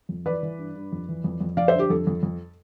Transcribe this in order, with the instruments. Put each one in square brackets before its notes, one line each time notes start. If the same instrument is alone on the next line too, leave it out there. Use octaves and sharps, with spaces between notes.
[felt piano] F2
E3 B4 D5
E3
G2
G2
F2
E3
F2
F2
F3 D5 F5
C5 E5
D3 G4
F2 A4
F2
F2